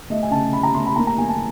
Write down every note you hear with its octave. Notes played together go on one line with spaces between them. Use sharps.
A3 D#5
G#5
C#3 A5
A3 B5
A#5
A3 C6
B5
A#3 A#5
A#5
A#3 G#5
A5